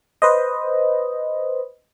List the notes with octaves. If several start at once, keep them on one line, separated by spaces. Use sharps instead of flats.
B4 C5 D#5